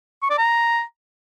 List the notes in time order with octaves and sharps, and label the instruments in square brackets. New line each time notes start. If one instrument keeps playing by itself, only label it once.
[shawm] C#6
D5
A#5